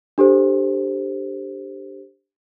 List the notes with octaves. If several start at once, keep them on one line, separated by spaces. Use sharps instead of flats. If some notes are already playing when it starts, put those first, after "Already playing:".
D4 G4 A4 C5